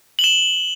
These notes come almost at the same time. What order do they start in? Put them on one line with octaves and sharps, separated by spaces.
F#7 G7 E7